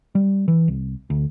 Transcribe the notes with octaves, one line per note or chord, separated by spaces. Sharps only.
G3
E3
C2
D2